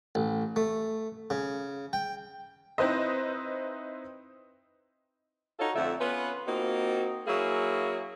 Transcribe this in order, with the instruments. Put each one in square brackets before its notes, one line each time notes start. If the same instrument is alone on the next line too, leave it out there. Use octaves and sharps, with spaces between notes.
[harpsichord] A1
A3
C#3
G5
[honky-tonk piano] C4 D#4 E4 B4 C5 D#5
[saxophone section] D#4 F4 F#4 A4 C#5
F2 D3 A3 F4 E5
B3 C#4 F4 B4
A#3 C4 D#4 F4 F#4
F#3 A#3 E4 G#4